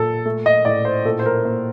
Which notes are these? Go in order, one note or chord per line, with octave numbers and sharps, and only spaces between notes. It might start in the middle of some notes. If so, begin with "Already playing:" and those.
Already playing: A#2 A4
A3
D#5
A2 D5
C5
A#2 A4
C5
A#4
A#3 C5